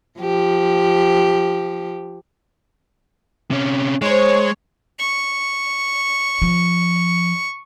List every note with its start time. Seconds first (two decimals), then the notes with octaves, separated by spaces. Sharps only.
0.19 F3 G4
3.51 C3 C#4
4.02 G#3 D#4 C5 C#5
4.99 C#6
6.42 F3